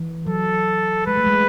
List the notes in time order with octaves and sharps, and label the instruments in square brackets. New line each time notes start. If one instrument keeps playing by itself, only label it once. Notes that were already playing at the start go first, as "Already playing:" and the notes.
Already playing: [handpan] E3
[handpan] F#3 [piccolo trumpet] A4
[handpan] G#3 [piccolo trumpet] B4
[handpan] A3
G#3